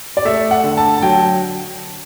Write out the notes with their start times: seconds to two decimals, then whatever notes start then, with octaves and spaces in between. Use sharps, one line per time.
0.17 D5
0.25 A3 E5
0.51 F#5
0.63 D3
0.77 A5
0.98 A5
1.02 F#3 G5